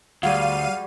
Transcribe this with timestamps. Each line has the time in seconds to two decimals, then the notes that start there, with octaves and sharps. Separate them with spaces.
0.23 D2 G3 F#4 G#4 F5 D#7